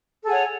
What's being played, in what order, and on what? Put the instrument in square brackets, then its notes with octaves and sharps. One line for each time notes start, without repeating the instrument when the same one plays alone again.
[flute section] A4
G#4
F#5
C#5